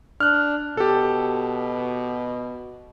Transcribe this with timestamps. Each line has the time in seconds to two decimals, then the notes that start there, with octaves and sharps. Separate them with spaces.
0.20 D4 F6 F#6
0.77 B2 G4 A4